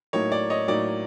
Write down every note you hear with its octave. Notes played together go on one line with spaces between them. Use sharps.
A2 F#3 A#3 D#4 C#5
D5
C#5 D#5
A2 F#3 A#3 D#4 D5